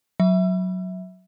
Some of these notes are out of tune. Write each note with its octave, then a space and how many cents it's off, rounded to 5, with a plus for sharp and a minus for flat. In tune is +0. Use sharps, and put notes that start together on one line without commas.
F#3 +0 E5 -15